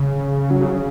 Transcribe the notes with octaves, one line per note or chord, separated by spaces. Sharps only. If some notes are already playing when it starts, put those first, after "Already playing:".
Already playing: C#3
F#3
C#3
C#3